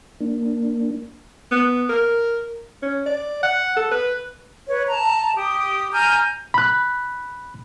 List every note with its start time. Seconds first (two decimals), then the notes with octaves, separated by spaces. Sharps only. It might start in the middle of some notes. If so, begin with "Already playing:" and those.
0.21 A#3 D4
1.51 B3
1.89 A#4
2.82 C#4
3.06 D5
3.43 F#5
3.76 A4
3.91 B4
4.67 B4 C#5
4.89 A5 A#5
5.36 G4 D#6
5.93 G#5 A#5 F6 G6
6.54 B5 F#6